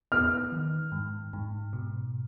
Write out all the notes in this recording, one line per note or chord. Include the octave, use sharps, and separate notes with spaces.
B3 F6
D#3
G#2
G#2
B2